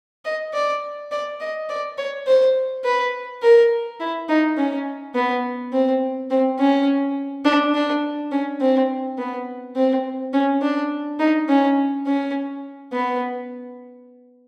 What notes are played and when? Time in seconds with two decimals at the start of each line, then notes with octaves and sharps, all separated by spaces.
0.25 D#5
0.54 D5
1.11 D5
1.40 D#5
1.69 D5
1.98 C#5
2.26 C5
2.84 B4
3.42 A#4
4.00 E4
4.28 D#4
4.57 C#4
5.14 B3
5.72 C4
6.30 C4
6.59 C#4
7.45 D4
7.74 D4
8.31 C#4
8.61 C4
9.18 B3
9.76 C4
10.33 C#4
10.62 D4
11.19 D#4
11.48 C#4
12.06 C#4
12.92 B3